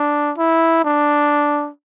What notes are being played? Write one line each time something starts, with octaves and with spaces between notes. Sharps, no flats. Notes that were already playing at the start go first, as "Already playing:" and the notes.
Already playing: D4
E4
D4